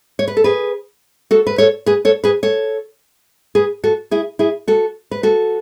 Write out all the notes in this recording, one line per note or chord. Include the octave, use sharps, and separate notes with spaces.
C#5
B4
A4
G#4 B4
F#4 A4
B4
A4 C#5
G#4 B4
A4 C#5
G#4 B4
A4 C#5
G#4 B4
F#4 A4
E4 G#4
E4 G#4
F#4 A4
B4
F#4 A4